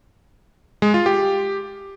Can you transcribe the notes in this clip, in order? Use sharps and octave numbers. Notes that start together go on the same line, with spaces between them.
G#3
F4
G4